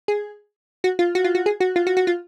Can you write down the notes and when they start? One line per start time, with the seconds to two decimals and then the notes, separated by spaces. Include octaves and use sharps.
0.08 G#4
0.84 F#4
0.99 F4
1.15 F#4
1.24 F4
1.35 F#4
1.46 G#4
1.60 F#4
1.76 F4
1.87 F#4
1.97 F#4
2.07 F4